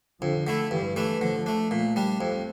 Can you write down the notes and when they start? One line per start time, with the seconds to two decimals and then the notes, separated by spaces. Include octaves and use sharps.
0.21 F2 D3 F3
0.47 D3 A3 E4
0.71 G2 E3 G3
0.96 E3 A3 D4
1.21 D3 F3 A3
1.46 A3 D4
1.71 A#2 F3 A3
1.96 G3 D4
2.20 F2 A3 C4